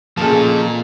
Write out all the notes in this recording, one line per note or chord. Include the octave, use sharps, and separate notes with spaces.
A#2 C#3 F3 A4 A5